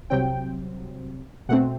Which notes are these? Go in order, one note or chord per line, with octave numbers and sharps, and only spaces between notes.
C2 C3 F#3 C4 G5
B2 A3 C4 F#5